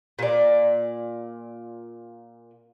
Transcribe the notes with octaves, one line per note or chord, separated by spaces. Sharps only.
A#2 D5